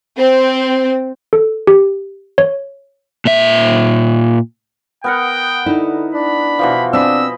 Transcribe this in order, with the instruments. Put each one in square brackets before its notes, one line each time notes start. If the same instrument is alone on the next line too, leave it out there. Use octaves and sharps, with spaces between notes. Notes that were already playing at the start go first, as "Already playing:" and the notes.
[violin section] C4
[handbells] A4
G4
C#5
[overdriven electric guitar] A#2 E5
[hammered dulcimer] B3 A#4 F#5 [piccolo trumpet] G5
[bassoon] D3 [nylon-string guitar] D#4 E4
[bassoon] D4 [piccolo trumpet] B5
[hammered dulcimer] B2 E3 F3
[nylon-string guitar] C4 [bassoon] D4 [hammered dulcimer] D#5 G#5 B5 [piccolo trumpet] E6